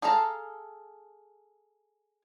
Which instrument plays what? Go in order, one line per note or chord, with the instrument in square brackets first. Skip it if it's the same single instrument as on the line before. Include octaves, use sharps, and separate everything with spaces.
[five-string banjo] G#4 A4 F5 A5 A#5